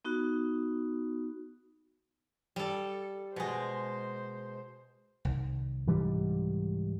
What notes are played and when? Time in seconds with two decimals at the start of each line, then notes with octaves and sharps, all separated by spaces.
0.05 B3 D#4 F#4
2.56 G3 A4
3.36 B2 G#3 C5
5.25 C2 D#3
5.87 G#2 E3 G3